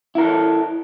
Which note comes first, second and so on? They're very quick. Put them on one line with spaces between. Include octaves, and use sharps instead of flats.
E4 A#4 A4